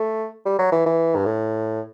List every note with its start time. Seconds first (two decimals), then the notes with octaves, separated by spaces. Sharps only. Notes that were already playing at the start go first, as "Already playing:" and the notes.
Already playing: A3
0.46 G3
0.59 F#3
0.72 E3
0.86 E3
1.16 G2
1.26 A2